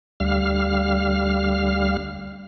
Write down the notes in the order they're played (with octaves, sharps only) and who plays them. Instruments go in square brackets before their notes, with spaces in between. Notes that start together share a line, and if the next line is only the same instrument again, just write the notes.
[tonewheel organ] D2 G3 F5 F6